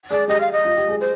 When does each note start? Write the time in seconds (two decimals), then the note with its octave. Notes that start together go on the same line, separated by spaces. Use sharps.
0.10 G#4 D5
0.28 G4 D#5
0.40 F5
0.52 D#5
0.65 F4
0.76 G4
0.89 G#4
1.00 C5